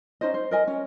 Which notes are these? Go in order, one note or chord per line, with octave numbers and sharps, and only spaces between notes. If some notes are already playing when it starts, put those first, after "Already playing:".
C#4 D#4 C5 D#5
C5
A#4 D#5 G#5
C#4